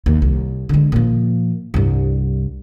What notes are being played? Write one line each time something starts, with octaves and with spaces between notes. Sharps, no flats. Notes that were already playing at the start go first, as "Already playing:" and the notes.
D#2
C2
D3 G#3
A#2 F3
C2 G2